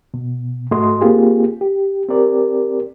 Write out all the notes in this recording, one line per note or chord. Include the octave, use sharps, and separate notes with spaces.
B2
G#2 A3 F#4 A4 D#5 C6
A#3 C4 F4 G4 G#4
G4
C4 G4 A#4 D5